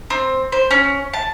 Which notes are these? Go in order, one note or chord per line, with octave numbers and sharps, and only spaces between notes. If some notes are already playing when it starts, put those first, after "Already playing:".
C4
C5
C#4
A5